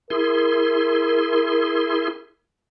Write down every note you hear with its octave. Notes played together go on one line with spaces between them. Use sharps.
E4 G#4 A#4 C6